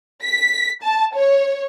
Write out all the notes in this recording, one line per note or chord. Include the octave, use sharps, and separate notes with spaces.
B6
A5
C#5